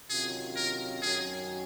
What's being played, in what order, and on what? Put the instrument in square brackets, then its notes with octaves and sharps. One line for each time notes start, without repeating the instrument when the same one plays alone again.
[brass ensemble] C3 D#3 F#3 C#4 F4 [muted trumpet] G#4
[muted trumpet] A#4
[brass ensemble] F#2 D#3 F#3 C#4 [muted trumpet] G#4